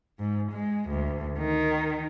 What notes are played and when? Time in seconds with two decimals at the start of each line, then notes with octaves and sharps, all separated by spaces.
0.19 G#2
0.52 G#3
0.90 D2
1.38 D#3